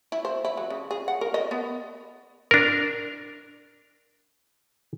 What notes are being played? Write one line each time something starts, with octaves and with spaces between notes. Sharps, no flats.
E4
C5
E4
F#3
C#3
G#4
F#5
A#4
D#5
B3
D4 A#4